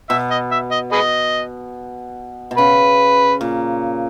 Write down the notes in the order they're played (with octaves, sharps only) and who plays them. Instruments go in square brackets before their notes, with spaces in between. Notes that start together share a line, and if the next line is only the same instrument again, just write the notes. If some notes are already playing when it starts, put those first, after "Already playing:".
[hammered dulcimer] B2 [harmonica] E5
[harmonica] D#5
E5
D#5
G#4 B4 D#5
[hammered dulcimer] B2
[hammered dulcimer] C#3 [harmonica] B4
[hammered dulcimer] A#2